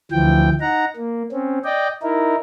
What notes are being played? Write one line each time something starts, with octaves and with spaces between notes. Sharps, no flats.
D2 E3 F3 G5
D#4 F#5 A#5
A#3
C4 C#4
D5 D#5 G5
D#4 E4 A#4